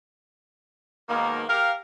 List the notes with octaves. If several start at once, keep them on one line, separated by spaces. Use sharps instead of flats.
G#2 B2 D#3 A#3
G4 A#4 F5